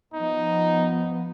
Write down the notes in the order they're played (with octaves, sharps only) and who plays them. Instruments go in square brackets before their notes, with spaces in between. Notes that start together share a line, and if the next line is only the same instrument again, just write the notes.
[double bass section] F3 B3 [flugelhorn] D#4